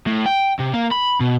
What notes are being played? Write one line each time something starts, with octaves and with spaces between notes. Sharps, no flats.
A2
G5
C3
A#3
B5
B2